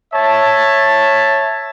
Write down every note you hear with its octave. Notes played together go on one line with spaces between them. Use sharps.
C#5 E5 A5